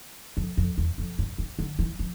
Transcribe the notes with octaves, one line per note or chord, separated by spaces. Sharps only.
F2
F2
E2
F2
G2
D3
D3
E3
F3